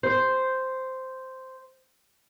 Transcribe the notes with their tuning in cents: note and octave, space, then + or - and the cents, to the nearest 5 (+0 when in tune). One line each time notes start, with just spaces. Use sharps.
C5 -5